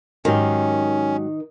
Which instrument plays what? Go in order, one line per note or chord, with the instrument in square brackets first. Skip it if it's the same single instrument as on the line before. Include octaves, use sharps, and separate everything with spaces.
[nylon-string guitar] G#2 F#3 G4 [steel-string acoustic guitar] D#3 [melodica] C#4